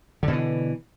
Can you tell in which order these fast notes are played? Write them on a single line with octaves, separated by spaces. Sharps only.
D3 B2 E3